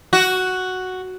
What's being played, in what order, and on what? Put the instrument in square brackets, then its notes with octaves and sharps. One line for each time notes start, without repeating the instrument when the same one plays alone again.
[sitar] F#4